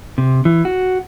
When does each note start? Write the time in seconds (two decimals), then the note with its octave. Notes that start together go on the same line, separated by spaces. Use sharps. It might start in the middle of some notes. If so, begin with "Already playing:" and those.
0.18 C3
0.45 E3
0.65 F#4